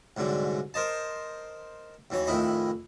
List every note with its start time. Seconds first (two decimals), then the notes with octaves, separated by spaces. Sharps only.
0.17 C2 G#2 D3 F#3
0.74 A#4 C5 D#5 A5
2.10 D#2 E3 F#3 C#5
2.27 A1 F2 D#3 E4 D#5 B5